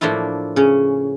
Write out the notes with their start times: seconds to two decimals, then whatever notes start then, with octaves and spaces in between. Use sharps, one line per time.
0.01 A2 F3 A#3 D4 E4 F4
0.56 C#3 C#4